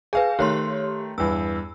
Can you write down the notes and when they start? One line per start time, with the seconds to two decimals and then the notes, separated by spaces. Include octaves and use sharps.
0.13 G#4 B4 F5 G#5
0.39 D#3 A3 G4 C#5 C6
1.18 E2 G2 E6